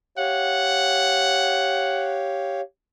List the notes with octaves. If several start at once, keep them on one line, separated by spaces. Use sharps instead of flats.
G4 C#5 F5 F#5